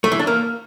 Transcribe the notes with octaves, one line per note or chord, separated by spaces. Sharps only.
A3
E3
D4
A#3